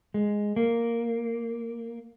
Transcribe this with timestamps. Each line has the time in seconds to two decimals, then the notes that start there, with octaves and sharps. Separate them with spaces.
0.14 G#3
0.56 A#3